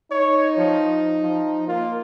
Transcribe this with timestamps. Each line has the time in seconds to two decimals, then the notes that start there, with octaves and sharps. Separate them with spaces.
0.11 D#4 C#5
0.58 F3
1.21 F3
1.68 A#3 F4